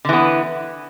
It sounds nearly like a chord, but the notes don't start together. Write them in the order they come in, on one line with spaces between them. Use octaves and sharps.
D3 E3 B3